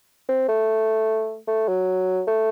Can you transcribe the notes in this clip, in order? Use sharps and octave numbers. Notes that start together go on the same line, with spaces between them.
C4
A3
A3
F#3
A3